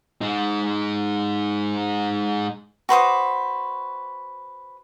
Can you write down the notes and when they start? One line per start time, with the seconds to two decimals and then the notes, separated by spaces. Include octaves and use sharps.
0.21 G#3 D#4
2.89 F#4 B4 C5 D#6